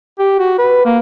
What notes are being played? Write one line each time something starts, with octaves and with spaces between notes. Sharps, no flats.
G4
F#4
B4
A#3